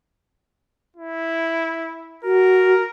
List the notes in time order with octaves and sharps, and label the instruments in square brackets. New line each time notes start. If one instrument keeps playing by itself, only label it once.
[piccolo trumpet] E4
[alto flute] F#4 [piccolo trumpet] A#4